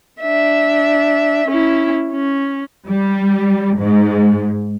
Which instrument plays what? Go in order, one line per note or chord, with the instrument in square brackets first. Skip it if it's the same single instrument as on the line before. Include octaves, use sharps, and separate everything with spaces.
[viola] D4 E5
C#4 E4
C#4
[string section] G3
G#2